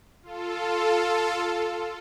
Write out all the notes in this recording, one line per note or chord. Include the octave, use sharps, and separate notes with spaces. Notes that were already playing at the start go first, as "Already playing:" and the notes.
F4 A4